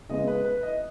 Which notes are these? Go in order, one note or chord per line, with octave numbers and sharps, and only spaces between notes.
C#3 G#3 B3 D#5
B4
B4
D#5